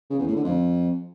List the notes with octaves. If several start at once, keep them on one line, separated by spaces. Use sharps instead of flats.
C#3
E2
A2
D3
F2